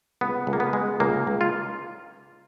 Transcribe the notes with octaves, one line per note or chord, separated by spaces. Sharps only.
C#2 B3
C#2
A#3
B3
G#3
C#2 A#3
C#2
F4